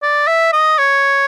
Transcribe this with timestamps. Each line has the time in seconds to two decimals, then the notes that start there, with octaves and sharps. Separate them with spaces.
0.02 D5
0.28 E5
0.53 D#5
0.78 C#5